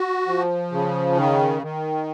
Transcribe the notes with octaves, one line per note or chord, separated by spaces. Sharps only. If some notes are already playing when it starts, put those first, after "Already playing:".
Already playing: F#4
F3
C#3
D#3
D#3